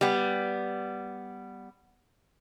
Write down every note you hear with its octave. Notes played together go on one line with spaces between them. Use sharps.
G3 B3